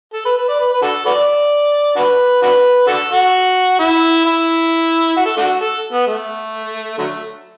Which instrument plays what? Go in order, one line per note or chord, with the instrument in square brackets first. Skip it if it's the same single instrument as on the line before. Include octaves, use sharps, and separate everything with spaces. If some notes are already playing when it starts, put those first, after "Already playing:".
[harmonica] A4
B4
B4
D5
B4
B4
D4 F#4 A4
F#4 B4 D5
D4 F#4 B4
D4 F#4 B4
D4 F#4 A4
F#4
E4
E4
F#4
A4
A3 D4 F#4
A4
B3
A3
D3 F#3 A3